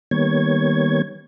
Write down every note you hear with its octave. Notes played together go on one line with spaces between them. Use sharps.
D#3 G3 A#3 B3 C#5 G#6